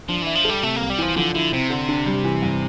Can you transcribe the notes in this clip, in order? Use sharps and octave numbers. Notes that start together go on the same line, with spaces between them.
F3 D4
E3 E5
F3
G3 A4
C3 A3
C2 A#3
G3
E3 F3
D3 F3
D3 E4
C3 C4
D3
D4
G3
E3
G2